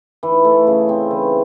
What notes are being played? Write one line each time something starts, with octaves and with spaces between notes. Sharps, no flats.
E3
A3
C#3
C4
E3